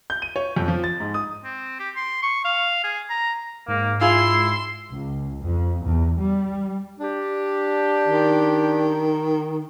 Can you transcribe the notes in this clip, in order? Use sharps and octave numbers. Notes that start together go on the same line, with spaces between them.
G6
D#7
C#5
F2
F3
A6
G#2
D#6
C4
G4
C6
C#6
F5
G#4
A#5
G#2 A#3
E4 F4 G#4 C6
C#2
F2
E2
G3
D4 G4
D#3